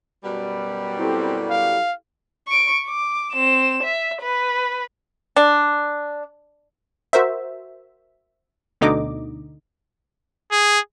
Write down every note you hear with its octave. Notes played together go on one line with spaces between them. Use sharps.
F#2 B2 G3
C4 E4 G4 A4
F5
C#6 D7
D6
C4 E7
E5
B4
D4
F#4 A#4 C5 E5
D2 B2 D3 D#4 D#5 D6
G#4